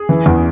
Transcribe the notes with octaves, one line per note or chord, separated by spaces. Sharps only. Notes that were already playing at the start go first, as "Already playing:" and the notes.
Already playing: G#4
E3
E2